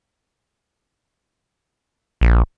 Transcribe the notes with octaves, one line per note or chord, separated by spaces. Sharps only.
A#1